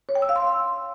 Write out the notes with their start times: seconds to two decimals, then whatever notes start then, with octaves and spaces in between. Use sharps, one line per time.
0.09 C#5
0.15 G5
0.22 E6
0.29 F5
0.36 C6